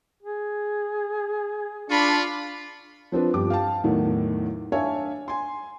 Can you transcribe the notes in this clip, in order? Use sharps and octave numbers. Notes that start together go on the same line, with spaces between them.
G#4
D4 F4 B5 C#6
F3 C4 D4 B4
G1 F3 G4 D6
F5 G5 A5
E2 A2 D#3 F#3
D4 C#5 E5 F5 G#5 A5
G#5 C6